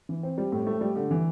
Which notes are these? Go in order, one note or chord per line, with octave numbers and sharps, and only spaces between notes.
E3
C4
G3
A2
A3
G3
D3
E3